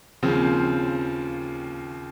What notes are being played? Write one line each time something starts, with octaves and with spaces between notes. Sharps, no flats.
D#2 C#3 F3 C4